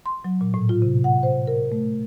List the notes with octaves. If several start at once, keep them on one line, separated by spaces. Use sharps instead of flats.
C6
F#3
A#2
A2
F4
C3
F#5
C5
A#4
A3